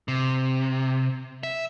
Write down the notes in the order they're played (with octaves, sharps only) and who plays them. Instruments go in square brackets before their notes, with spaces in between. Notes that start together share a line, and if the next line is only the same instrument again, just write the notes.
[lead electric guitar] C3
E5